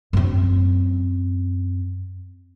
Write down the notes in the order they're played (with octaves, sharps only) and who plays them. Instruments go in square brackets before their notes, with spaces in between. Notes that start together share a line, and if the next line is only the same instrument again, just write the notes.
[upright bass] F#2 C4